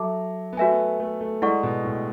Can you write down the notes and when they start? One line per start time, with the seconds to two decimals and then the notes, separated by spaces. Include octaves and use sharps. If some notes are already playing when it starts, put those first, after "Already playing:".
Already playing: F#3 A4 E5 A5 D6
0.53 B3
0.57 A3 F#4 B4 E5 G#5
0.71 B3
1.00 A3
1.21 A3
1.42 G#3 E4 A4 D5 F#5 C#6
1.63 B2
1.84 A2